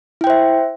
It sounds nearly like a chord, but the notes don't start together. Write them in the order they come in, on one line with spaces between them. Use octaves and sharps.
E4 G5 C5 E5